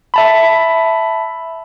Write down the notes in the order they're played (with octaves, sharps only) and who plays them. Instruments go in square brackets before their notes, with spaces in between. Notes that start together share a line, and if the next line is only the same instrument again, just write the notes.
[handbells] E5 A5 B5